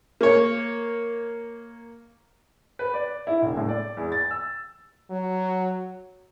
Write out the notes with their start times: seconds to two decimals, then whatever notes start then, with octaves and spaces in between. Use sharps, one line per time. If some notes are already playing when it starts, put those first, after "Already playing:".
0.21 A#3 C#5
2.79 B4
2.94 D5
3.27 E4
3.42 E1
3.57 A2
3.69 D5
3.97 E2
4.12 A6
4.31 E6
5.10 F#3